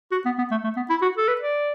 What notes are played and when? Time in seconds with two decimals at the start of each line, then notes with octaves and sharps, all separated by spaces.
0.11 F#4
0.25 B3
0.38 B3
0.51 A3
0.64 A3
0.76 B3
0.90 E4
1.02 F#4
1.17 A4
1.28 B4
1.41 D5